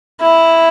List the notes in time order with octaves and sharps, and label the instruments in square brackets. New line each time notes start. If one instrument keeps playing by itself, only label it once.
[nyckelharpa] E4